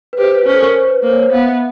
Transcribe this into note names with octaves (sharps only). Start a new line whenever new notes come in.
B4
G4 C5
B4
C#4 C5
A4
A#4
C5
B4
A#3 C5
C#5
C5
B3 F5
E5